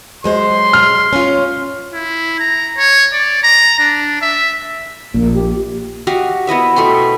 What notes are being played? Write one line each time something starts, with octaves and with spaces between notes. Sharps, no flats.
F#3 G#3 C5 C6
F6
C#4 F4
E4
A#5
C#5
D5
A#5
D4
E5
A#1 A#2 A#3
G4
F#4 G4 D#5 F5
B3 E4 D#5 E5
B2 A3 G5 C6